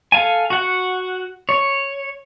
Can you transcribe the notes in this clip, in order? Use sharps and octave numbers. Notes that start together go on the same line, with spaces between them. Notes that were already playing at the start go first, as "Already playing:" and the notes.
A4 F5 G#5
F#4 F#5
C#5